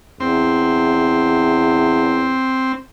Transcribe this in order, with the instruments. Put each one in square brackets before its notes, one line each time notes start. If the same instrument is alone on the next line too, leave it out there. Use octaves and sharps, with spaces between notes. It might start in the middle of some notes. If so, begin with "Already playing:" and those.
[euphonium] E2 [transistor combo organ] C4